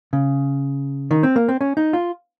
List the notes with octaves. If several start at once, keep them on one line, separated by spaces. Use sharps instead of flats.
C#3
D#3
C4
A#3
C4
C#4
D#4
F4